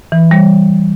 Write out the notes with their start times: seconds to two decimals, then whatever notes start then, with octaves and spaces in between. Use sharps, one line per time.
0.12 E3
0.31 G3